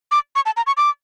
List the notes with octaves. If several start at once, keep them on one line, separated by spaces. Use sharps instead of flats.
D6
C#6
A5
A#5
C#6
D6